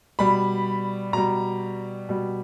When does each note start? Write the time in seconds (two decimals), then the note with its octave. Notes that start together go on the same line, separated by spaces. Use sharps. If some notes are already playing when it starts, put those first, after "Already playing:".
0.19 B2 G3 B5
1.13 B2 G3 A#5
2.09 B2 G3